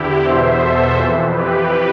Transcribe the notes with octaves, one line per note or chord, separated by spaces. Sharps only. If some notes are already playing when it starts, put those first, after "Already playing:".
Already playing: E2 D3 E4 G4
E2 B2 C5 E5
A4 C5
F2 E3
G4 B4